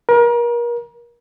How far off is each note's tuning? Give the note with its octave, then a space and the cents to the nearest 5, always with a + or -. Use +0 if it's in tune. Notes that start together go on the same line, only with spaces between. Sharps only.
A#4 +35